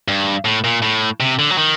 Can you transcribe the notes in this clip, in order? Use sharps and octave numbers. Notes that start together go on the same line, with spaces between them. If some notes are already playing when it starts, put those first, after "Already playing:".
G2
A2
A#2
A2
C3
D3
F#3
D#3